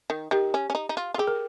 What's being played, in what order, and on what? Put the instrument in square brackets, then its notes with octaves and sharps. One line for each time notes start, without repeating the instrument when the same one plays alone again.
[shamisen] D#3
[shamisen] D#3 [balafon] G4
[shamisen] C#4
C#4
D#4
D#4
F4
F4
[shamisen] G4 [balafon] G#4
[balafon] A#4